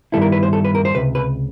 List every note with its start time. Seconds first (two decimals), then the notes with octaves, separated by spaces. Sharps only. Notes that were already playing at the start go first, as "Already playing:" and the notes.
0.12 G2 D#3 G3 B3 E4 A4
0.22 A#4
0.32 B4
0.43 C5
0.53 A4
0.65 B4
0.75 A#4
0.85 C5
0.95 C#2 C3 B4
1.15 B4